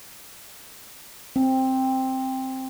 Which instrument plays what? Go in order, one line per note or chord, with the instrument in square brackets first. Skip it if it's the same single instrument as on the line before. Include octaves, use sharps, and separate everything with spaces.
[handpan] C4